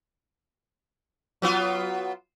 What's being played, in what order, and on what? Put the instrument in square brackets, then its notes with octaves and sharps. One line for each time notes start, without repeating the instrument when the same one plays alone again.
[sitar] F#3 B3 F4